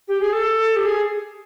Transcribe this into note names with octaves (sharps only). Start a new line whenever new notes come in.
G4
G#4
A4
G4
G#4